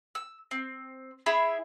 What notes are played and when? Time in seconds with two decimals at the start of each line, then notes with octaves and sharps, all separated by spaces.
0.15 E6
0.51 C4
1.26 E4 G#4 E5 B5